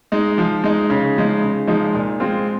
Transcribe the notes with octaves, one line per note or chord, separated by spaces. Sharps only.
G#3 D#4
F3
G#3 D#4
C#3
F3 G#3 D#4
C#3
F3 G#3 D#4
A#2
G#3 C4 F4